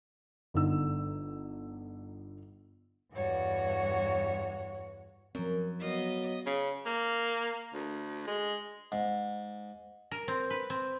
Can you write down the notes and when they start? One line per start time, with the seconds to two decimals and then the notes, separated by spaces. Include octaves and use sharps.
0.54 G1 D3 D#4 E6
3.13 E2 G2 F#4 C#5
5.35 F#2 F3 C4
5.81 F#3 B3 D#5 F5
6.46 C#3
6.86 A#3
7.74 D2
8.27 G#3
8.92 G#2
10.11 A#4
10.28 C4
10.50 B4
10.70 C4